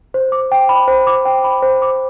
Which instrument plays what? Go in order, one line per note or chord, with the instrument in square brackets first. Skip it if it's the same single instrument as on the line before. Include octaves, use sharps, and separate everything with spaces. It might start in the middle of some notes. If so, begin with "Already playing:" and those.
[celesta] C5
D6
G5
B5
C5
D6
G5
B5
C5
D6